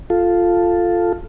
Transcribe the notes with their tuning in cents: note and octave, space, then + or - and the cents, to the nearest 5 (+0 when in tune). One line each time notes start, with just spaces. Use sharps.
F4 +0 A4 +0